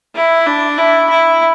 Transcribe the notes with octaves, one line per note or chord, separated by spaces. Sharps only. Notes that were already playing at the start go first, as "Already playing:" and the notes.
E4
D4
E4
E4